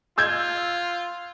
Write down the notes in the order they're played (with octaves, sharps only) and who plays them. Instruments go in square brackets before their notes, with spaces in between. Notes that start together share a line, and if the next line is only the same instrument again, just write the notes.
[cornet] F4 [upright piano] E6 G6 G#6